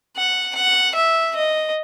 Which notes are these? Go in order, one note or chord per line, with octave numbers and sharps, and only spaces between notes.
F#5
F#5
E5
D#5